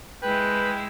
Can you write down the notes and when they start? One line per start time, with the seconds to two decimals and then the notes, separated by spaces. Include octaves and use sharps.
0.22 G#3 E4 B4 G5